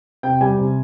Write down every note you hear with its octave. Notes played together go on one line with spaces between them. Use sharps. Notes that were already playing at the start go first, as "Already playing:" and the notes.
C3 G5
G3 G#5
C3